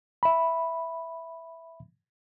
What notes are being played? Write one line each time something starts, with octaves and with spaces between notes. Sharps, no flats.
E5 B5